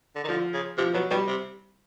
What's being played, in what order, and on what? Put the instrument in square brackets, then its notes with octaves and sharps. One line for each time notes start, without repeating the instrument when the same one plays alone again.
[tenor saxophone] D3
D#3
[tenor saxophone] D3 [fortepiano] F3
[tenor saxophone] C#3
[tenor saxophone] C3 [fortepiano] F3
[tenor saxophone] B2 [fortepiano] F#3
[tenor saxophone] B2 [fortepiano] G3
[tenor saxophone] C3